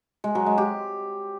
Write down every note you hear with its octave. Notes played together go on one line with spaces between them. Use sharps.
G#3
F#3
G#3
G4